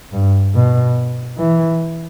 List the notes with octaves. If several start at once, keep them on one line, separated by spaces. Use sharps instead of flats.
G2
B2
E3